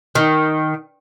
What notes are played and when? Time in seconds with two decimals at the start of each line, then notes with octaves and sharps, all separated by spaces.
0.15 D#3